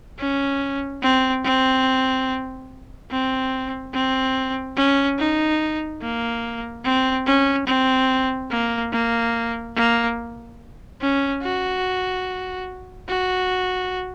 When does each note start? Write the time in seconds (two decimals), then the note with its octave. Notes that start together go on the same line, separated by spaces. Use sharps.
0.18 C#4
1.02 C4
1.44 C4
3.11 C4
3.93 C4
4.77 C#4
5.18 D#4
6.01 A#3
6.84 C4
7.26 C#4
7.67 C4
8.50 A#3
8.92 A#3
9.76 A#3
11.01 C#4
11.42 F#4
13.08 F#4